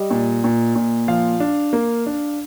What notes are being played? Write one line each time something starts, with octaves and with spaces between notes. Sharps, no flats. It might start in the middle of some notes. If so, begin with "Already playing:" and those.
Already playing: G3 D#5
A#2
A#2
A#2
F3 F5
D4
A#3
D4